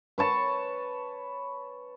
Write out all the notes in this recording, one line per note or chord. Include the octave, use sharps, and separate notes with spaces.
B4 C#5 A5 C#6